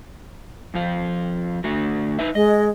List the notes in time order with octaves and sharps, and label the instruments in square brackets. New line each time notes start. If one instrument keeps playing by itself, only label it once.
[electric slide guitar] F2 F3 F4
D3 A3 F#4
D#4 B4 E5
[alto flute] G#3 [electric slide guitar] D#5